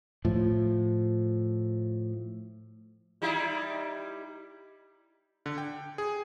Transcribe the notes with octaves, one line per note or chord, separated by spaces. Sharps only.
A2 F3
G3 D#4 E4
D3
G5
G#4